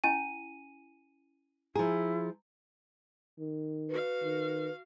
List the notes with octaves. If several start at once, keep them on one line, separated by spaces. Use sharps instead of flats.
C#4 E4 G#5 D#7
F3 E4 G#4 A#5
D#3
F#4 B4 F5
D#3